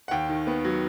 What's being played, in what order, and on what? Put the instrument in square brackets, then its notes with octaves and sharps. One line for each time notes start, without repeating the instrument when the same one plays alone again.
[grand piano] F#5
D#2 G5
D#3
B3
F#3